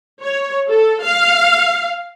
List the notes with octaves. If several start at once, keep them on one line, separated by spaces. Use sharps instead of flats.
C#5
A4
F5